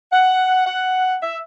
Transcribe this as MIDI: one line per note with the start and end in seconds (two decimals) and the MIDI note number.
0.12 0.64 78
0.66 1.16 78
1.23 1.37 76